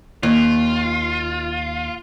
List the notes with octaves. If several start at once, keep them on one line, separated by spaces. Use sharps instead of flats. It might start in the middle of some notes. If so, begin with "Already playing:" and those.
D#2 F4